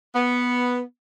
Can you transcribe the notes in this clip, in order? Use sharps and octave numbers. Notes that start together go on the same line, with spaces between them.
B3